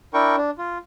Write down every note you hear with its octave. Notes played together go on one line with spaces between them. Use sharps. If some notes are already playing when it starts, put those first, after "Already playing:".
D4 E4 A#4 G5 C#6
D4
F4